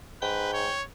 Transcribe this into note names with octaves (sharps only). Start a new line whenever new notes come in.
G#2 B4 G5
C#5